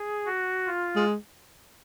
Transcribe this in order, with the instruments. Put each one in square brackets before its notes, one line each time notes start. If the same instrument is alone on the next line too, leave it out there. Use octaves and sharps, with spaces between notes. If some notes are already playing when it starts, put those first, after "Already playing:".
Already playing: [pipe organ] G#4
F#4
F4
[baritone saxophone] G#3